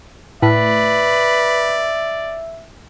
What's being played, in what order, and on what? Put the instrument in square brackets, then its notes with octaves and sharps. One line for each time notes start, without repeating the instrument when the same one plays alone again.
[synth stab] A2 [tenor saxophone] B4 [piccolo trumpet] D5 [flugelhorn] E5